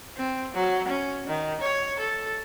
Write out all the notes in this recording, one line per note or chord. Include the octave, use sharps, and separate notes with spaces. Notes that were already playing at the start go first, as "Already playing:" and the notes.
C4
F#3
C#4
D#3
C#5
A4